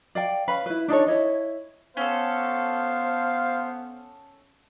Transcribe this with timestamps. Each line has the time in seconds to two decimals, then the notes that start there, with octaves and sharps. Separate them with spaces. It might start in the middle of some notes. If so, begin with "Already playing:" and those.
0.15 D5 F5 G5
0.48 C#4 B4 F5 B5
0.66 E4 B4
0.88 D4 D#4 A4 C#5
1.07 E4 C#5 D#5
1.97 B3 C#4 A4 C5 F5